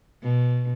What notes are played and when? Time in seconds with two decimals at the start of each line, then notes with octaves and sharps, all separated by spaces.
0.23 B2